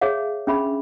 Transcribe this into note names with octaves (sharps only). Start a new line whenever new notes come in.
G#4 C#5 E5 F5
C#4 D4 G#4 E5 B5